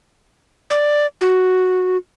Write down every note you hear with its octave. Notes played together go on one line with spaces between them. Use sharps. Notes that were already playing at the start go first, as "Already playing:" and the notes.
D5
F#4